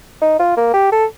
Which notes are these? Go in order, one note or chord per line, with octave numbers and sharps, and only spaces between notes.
D#4
F4
A#3
G4
A4